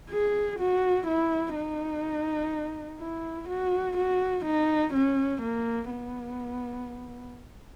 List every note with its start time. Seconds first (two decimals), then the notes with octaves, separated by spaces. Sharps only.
0.10 G#4
0.59 F#4
1.07 E4
1.56 D#4
3.01 E4
3.49 F#4
3.97 F#4
4.45 D#4
4.94 C#4
5.42 A#3
5.90 B3